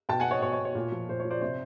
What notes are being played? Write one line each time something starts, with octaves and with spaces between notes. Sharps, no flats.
B2 G5 A5
F#5 G#5
C#5 D#5
B2 C#5
C#5
C#5
A#2
F3
A#2 C5
C#5
F3
C5 D5
C3 C5